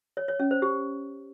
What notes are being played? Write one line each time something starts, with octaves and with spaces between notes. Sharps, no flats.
C#5
C#5
C#4
C5
G4